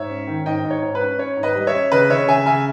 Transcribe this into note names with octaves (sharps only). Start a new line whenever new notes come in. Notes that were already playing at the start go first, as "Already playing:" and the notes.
Already playing: G#2 C#5 E5
C#4
D#3
G#2 D#5 G5
G#2
C#5
G#2
B4
C#4
C#4 C#5
G#2
B4 D#5
G3
C#5 E5
C#4
C#3 B4 D#5
C#3 C#5 E5
C#3 E5 G#5
C#3 E5 G#5